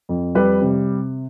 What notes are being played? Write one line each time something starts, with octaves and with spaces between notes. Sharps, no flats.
F2
G3 B4 B5
C3